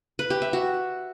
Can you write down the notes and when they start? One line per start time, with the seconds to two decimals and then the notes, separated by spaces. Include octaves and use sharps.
0.19 B4
0.30 G4
0.42 E5
0.53 F#4